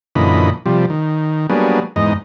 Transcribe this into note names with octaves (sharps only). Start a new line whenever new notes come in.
F#2 A#2 D3 E3 D#5 B5
C3 F3 G3
D#3
F#3 G3 A#3 B3 D4 G#4
E2 G#2 D#4 D#5